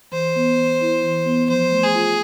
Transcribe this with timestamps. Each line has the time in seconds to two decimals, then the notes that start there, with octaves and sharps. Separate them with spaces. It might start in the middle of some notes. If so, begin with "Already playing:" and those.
0.12 E3 C5
0.36 B3
0.58 E3
0.81 E4
1.03 E3
1.26 B3
1.48 F3 C5
1.71 A3
1.83 G#4
1.95 F4